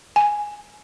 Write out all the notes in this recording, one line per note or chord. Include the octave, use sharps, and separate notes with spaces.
G#5